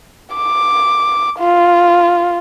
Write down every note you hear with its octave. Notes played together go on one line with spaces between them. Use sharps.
D6
F4